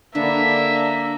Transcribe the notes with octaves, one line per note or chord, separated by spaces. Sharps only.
D3 A#3 B3 D4 E5